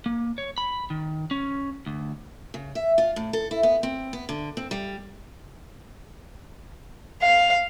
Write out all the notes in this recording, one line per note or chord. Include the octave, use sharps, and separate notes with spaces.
A#3
C#5
B5
D#3
C#4
D2
C#3
E5
F4
A2
A4
E4
B3
C4
B3
D3
C4
G3
F5